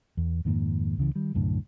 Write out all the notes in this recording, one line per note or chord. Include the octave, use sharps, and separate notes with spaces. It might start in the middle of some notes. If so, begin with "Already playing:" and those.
E2
F2 G#2 D#3 A#3
C#2 C#3 E3
D#3 G3
C2 F#2 A2 D3